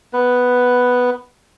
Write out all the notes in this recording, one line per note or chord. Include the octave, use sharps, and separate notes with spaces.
B3 B4